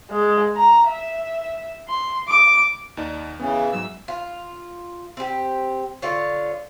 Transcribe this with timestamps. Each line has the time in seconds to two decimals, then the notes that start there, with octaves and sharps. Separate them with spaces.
0.11 G#3
0.57 A#5
0.88 E5
1.89 C6
2.28 D6
2.97 D#2 D#4 D5
3.40 C#3 E3 B3 C#4
3.72 G#2 F#3 E5 E6
4.08 F4
5.17 C4 G4
6.02 D3 F4 C#5